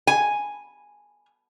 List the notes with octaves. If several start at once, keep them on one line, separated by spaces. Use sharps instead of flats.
G#5